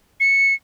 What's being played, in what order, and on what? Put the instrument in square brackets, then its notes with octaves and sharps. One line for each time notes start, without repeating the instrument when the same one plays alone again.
[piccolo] C#7